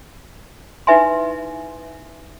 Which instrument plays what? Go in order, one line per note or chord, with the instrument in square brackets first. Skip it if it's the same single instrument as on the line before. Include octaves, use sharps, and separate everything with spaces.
[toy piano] D#4 E4 B4 E5 G#5 C6